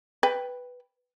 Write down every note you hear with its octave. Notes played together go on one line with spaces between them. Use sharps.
B4 G5